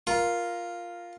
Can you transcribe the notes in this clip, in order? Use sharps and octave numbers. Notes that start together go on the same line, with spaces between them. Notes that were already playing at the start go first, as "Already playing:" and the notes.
F4 A#4